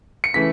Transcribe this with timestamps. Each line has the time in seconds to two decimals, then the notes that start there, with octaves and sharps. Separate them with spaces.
0.24 C#7
0.34 C#3 E3 A3 B6